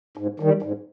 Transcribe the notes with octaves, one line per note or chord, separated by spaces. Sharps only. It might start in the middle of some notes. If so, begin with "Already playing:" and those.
G#2
D#3 G3
G#2